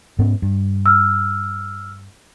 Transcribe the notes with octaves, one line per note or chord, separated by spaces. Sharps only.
G#2 B3 C#4
G2
E6 F6